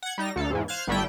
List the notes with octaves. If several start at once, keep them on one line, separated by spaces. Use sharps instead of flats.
F#5 G#6
G3 D#4 A#6
D2 A4 F5
E2 G#2 E3
C5 F5 F6 F#6 G#6
G1 D3 G3 A3 E4 G5